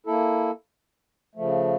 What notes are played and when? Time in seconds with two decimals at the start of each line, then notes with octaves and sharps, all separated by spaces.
0.06 A#3 E4 A4
1.35 C#3 F3 A3